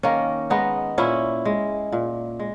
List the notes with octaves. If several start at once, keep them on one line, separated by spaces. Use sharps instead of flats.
D#3 A#3 C#4
G#3 B3 D#4
A#2 C#4 E4
G#3
A#2
G#3